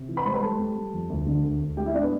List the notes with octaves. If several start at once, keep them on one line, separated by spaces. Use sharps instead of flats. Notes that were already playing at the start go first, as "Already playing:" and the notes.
Already playing: C3
E3
B4 B5
G3 C5 C6
B4 B5
G3 A4 A5
G3
G3
F2
D2
D3
D2
D2
G3 G4 G5
E4 E5
A2 D4 D5
B3 B4